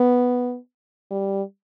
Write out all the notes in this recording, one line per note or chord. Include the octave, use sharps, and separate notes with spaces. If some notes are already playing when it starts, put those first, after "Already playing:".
Already playing: B3
G3